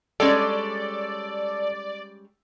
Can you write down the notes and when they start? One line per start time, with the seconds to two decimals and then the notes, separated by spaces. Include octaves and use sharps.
0.20 G3 G#3 C#4 A4 D5